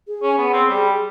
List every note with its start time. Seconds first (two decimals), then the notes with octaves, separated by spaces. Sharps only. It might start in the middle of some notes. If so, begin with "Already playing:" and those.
0.07 G#4
0.23 C#4
0.38 B3
0.53 C4
0.69 G3